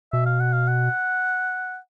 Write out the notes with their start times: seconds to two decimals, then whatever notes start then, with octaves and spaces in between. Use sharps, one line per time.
0.12 B2 E5
0.26 F5
0.40 F#5
0.53 F5
0.67 F#5